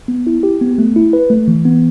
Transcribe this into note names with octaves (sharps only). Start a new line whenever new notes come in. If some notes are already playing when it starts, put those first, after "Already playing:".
B3
E4
G4
B3
A3
E4
B4
A3
E3
B3